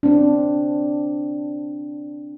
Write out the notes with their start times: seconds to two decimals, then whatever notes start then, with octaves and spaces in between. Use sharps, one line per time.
0.03 C4 D4